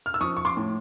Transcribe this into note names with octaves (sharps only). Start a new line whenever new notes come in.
F6
E6
F3 C#6 D#6
C#6
C6 D6
A2